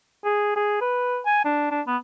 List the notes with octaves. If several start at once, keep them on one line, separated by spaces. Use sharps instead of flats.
G#4
G#4
B4
G#5
D4
D4
B3